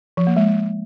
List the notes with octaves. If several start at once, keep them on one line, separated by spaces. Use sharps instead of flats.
F3
A#3
G#3